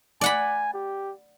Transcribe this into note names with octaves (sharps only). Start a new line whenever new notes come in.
D5 F#5 G#5 B5
G4